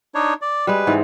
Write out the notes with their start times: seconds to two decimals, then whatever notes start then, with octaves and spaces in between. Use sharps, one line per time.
0.15 D4 D#4 C#5
0.42 D5
0.67 G3 G#3 B4
0.87 G#2 E3 C4